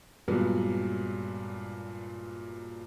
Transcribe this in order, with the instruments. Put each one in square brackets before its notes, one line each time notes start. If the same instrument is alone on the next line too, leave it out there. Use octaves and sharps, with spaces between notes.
[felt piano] G2 A#2 F#3 G#3 B3